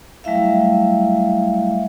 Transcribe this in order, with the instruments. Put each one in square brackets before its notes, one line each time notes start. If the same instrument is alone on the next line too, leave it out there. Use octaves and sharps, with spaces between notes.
[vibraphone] F#3 G3 A3 E4 E5 F5